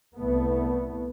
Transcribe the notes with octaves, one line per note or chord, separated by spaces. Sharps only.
C2 A3 B3